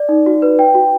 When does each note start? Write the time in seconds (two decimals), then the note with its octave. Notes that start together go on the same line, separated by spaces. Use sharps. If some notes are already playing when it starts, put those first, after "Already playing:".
Already playing: D5
0.09 D#4
0.26 F#4
0.42 B4
0.59 G5
0.75 F#4